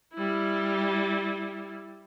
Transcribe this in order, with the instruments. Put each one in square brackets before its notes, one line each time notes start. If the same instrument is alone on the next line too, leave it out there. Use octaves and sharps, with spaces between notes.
[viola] G3 E4